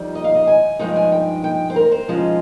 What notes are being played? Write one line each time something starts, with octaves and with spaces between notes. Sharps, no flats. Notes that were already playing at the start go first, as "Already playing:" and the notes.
Already playing: F2 D#3 G3
D#5
F5
D#5
G#5
G2 F3 G#3 D#4 G5
G#5
G5
G5
C5
A#4
C5
G#2 F3 G#3 C#4